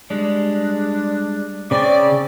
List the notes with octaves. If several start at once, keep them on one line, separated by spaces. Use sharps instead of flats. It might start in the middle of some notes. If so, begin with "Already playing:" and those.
G3 G#3 D4
C#3 C4 D5